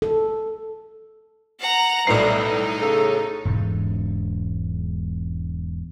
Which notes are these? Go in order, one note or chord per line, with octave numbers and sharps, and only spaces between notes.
A4
F#5 A#5
B1 A2 E3 G3 D#4 C7
C#3 A4
E1 G#2